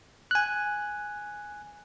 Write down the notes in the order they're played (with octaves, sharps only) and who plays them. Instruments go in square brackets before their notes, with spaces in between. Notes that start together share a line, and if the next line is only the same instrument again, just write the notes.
[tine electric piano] G#5 F#6